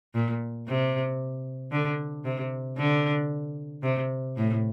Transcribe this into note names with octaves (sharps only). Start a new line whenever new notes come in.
A#2
C3
D3
C3
D3
C3
A2